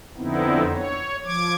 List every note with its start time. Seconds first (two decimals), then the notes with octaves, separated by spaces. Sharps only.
0.17 F2 D3 B3 C4 D#4 E4
0.73 C#5
1.25 F3 D6 G#6